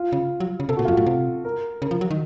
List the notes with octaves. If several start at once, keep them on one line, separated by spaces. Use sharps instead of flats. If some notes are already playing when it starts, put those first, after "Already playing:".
Already playing: F4
C#3
F#3
C#3
C3 A4
A#2 F#4
F4
F#2
A2 F#4
C3
A#4
C#3 A#4
F3
F#3
D#3